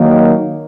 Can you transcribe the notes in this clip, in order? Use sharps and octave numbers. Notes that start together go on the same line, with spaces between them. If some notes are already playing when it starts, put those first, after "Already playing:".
Already playing: D#3 F#3 A#3 D#4